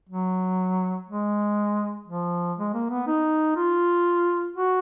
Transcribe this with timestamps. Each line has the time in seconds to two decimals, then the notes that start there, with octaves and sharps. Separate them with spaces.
0.09 F#3
1.09 G#3
2.08 F3
2.58 G#3
2.74 A#3
2.90 B3
3.07 D#4
3.56 F4
4.56 F#4